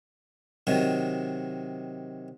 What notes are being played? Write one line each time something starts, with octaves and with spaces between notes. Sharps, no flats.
C3 D#3 F#3